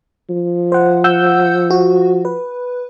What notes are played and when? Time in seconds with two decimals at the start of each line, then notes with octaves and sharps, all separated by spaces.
0.30 F3
0.72 C5 F#5
1.04 F#5 E6 G6
1.70 F#4
2.25 B4